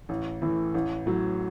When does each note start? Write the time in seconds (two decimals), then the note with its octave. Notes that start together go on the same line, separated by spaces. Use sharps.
0.09 A1
0.42 A2 E3
0.74 A1
1.06 A2 F#3